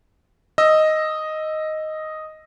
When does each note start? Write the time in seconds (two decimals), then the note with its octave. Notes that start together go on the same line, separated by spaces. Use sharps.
0.58 D#5 E6